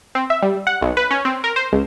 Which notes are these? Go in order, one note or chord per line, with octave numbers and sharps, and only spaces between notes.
C4
E5
G3
F#5
B1
B4
C#4
C4
A#4
C5
C#2